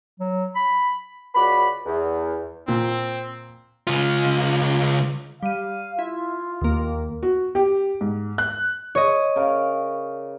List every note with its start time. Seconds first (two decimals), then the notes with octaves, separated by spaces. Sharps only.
0.20 F#3
0.55 B5
1.34 C#2 F#4 D5 B5
1.85 E2
2.68 A#2 C4
3.87 C#2 F4
5.43 G3 F5 D#7
5.99 E4 F4
6.61 D#2 A#3
7.23 F#4
7.55 G4
8.01 G#2
8.38 F#6
8.95 C#5 D#5
9.36 C#3 A#4 D5